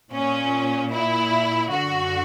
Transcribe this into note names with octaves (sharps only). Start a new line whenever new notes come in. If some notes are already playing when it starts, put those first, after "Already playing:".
A#2 C#4
E4
F#2 D3 F#4